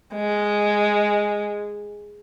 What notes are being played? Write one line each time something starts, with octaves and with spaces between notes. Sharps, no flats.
G#3